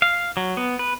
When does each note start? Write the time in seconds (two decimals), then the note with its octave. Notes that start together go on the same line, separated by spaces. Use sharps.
0.02 F5
0.37 F#3
0.57 B3
0.79 B4